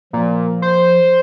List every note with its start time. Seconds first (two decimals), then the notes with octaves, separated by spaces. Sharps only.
0.13 A#2 F3
0.62 C5